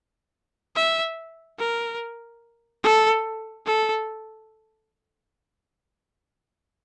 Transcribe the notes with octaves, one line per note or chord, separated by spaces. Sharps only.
E5
A#4
A4
A4